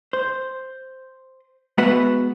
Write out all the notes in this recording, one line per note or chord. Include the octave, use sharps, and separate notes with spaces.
C5
G#3 B3 F#4 B4 E5 F#5